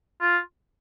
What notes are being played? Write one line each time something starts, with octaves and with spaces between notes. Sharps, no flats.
F4